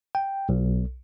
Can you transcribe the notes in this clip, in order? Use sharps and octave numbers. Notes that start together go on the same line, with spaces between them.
G5
B1